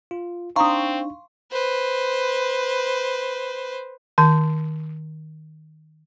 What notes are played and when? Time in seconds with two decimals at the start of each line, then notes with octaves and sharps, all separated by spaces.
0.11 F4
0.56 C4 D4 D#4 F5 A#5 C6 C#6 D#6
1.52 B4 C5
4.18 D#3 A5